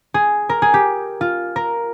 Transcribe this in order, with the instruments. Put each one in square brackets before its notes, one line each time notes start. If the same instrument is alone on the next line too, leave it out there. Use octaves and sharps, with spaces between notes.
[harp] G#4
A#4
G#4
G4
F4
A#4